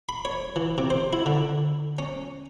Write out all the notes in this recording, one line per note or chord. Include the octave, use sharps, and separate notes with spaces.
B5
C#5
E3
C3
C5
E4
D3
C#4